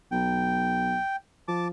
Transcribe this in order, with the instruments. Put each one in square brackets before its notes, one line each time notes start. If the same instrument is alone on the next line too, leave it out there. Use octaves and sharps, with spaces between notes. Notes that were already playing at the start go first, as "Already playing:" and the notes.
[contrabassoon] B1 [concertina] G5
[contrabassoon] F3 [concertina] A5 D6